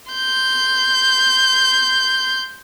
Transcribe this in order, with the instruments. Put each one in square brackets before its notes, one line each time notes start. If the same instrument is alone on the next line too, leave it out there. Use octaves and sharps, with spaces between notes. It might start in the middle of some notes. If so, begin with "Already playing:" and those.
[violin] C6 G6